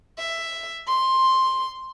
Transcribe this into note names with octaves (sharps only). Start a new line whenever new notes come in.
E5
C6